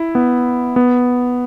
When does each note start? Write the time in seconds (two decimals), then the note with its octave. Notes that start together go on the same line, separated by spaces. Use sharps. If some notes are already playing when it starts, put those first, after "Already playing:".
Already playing: E4
0.15 B3
0.76 B3